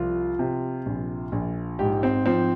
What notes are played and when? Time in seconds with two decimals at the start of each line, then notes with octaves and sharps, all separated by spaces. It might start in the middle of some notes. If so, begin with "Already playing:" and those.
Already playing: C2 F3 F4
0.39 C3
0.86 A#1
1.32 A#1
1.79 G#2 G4
2.03 C4
2.26 F3 C4